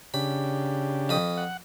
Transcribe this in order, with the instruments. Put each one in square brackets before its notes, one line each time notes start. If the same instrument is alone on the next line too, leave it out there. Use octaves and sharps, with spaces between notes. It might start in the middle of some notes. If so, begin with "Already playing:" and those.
[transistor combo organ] C#3 D4 G4 [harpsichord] B5
[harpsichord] F2 B5 D#6
[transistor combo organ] F#5